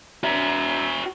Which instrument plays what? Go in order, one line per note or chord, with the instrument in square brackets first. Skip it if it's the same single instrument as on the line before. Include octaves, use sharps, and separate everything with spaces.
[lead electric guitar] F#4 E5